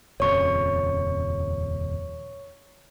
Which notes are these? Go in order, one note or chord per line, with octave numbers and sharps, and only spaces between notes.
D#1 F2 C#3 C#5 C#6